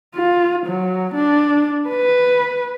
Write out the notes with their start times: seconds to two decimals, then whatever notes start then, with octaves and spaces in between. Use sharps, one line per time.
0.15 F4
0.67 F#3
1.15 D4
1.90 B4